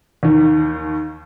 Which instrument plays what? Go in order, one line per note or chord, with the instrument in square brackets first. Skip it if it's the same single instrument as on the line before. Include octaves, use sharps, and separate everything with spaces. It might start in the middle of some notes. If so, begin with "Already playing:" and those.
[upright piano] D#2 D#3